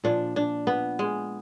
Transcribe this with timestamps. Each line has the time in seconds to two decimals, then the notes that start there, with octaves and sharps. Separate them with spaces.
0.04 A#2 F3 D4
0.36 D4
0.67 B3
0.99 G#3